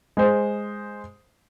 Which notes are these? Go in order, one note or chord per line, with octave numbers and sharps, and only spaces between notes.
G#3 C5